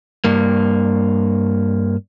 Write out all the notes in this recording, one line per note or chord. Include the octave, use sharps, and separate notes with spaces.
G2 A#3